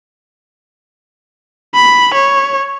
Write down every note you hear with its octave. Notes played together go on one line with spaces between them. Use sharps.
B5
C#5